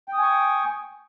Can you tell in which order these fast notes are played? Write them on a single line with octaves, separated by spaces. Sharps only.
G5 D#6 G#5 C#6